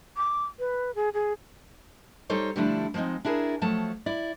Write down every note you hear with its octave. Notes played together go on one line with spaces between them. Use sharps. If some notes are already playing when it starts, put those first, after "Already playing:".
D6
B4
G#4
G#4
G3 D#4 A4 C5 C#5
D3 F3 G3 A3 D4 E4
F3 G#3 A#3 C4 D#4
D4 E4 G#4 A#4
F3 F#3 A3 A5
E4 D5